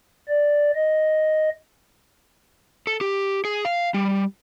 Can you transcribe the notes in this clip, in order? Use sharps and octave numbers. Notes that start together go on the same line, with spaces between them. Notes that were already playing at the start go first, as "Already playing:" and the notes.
D5
D#5
A4
G4
G#4
F5
G3